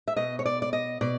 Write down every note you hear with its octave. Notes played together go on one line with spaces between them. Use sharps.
E5
B2 D#5
C#5
D5
D5
D#5
B2 D5